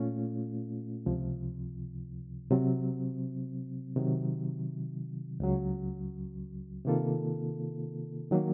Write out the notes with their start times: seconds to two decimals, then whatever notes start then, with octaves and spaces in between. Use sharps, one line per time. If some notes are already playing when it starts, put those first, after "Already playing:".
Already playing: A#2 A3 C#4 F4
1.06 C#2 C3 F3
2.51 C3 F#3 C4
3.96 C3 D#3 F#3
5.40 C#2 C#3 F#3
6.85 C3 D#3 A#3 F4 A4
8.31 D#3 F#3 A#3